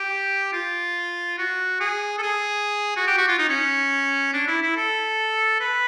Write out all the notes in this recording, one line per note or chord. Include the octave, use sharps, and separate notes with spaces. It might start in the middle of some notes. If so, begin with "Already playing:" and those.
Already playing: G4
F4
F#4
G#4
A4
G#4
F#4
G4
F#4
F4
D#4
C#4
D4
E4
E4
A4
B4